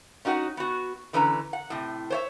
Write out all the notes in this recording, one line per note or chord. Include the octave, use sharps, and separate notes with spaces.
C#4 D#4 F#4 C#5 F#5
B3 F#4
D3 E3 C#4 B4 A5 A#5
F#5
A2 C3
C5 C#5 E5